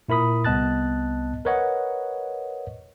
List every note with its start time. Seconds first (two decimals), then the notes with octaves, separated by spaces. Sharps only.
0.09 A#2 E4 A#4 B5 D#6
0.45 C2 B3 D#5 A5 F#6 A6
1.45 A#4 B4 C#5 D#5 F#5